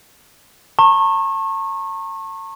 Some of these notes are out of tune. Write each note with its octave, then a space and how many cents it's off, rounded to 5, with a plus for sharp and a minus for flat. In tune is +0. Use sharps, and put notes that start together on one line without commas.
A5 +40 C#6 -30